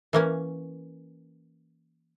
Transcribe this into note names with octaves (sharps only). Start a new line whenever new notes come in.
E3 A#3 C#4